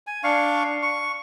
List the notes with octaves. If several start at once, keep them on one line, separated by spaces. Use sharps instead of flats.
G#5
D4 F5 C#6
C#6